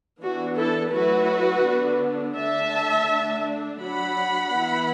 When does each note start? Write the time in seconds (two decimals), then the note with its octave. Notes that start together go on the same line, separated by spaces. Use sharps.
0.21 E3 B3 D4 F#4
0.56 E4 A4
0.93 F#3 A3 E4 F#4 B4
1.65 D3 B3 D4
2.36 D3 A3 D4 E5 A5
3.09 D3 A3 D4
3.81 F#3 D4 F#5 B5
4.53 E3 B3 E4